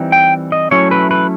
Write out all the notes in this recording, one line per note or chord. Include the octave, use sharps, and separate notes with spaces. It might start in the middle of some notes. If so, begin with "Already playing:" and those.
Already playing: E3 G3 C4 D#4
G5
D#5
F#3 A3 C#4 E4 C#5
B4
B4